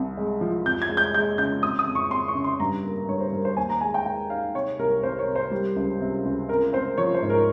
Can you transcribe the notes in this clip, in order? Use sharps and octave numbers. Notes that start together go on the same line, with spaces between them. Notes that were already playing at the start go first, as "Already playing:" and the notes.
Already playing: C2 C3
G#3
F3
F2 G6
G#6
G#3
G6
G#3 G6
C#3 G6
C4 D#6
D#6
F2
C#6
C4 C6
C#6
C#3
C6
G2 A#5
A#3
G2 C#5
C5
G2 A#4
C5
D#2 G#5
A#5
G#3 G#5
G5
G#3 G5
D#4 F5
C3 C#5
C2 A#4
C2 C5
C#5
C3
C5
G3
C#2
C3
C#2
C4 A#4
C4 C5
F3 C#5
C5
G#2
A#4